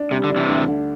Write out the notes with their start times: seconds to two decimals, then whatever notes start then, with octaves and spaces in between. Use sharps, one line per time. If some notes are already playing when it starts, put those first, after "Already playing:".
Already playing: D4
0.11 C3 G3
0.24 D3
0.30 D4
0.36 C3 E3
0.49 D2
0.68 D3